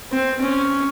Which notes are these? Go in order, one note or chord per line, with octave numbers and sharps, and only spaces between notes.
C4
C#4